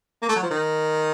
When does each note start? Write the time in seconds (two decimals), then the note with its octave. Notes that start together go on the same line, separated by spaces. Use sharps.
0.22 A#3
0.29 A3
0.36 F#3
0.43 F3
0.51 D#3